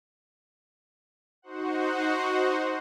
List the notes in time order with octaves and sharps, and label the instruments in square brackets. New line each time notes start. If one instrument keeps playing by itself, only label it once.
[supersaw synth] D#4 F#4 C5 F#5